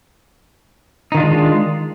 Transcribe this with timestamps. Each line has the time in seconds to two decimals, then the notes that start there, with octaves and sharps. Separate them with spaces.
1.12 D#4
1.15 D#3
1.17 F4
1.20 D4
1.23 G#3